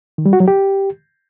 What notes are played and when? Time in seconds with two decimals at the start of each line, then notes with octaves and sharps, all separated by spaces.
0.18 D#3
0.26 G3
0.33 F#4
0.40 F#3
0.48 G4